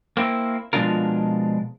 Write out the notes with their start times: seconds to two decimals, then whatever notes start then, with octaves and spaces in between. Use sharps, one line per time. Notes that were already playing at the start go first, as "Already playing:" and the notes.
0.17 A#3 C4 E4
0.73 B2 F3 G#3 D4 F4 A#4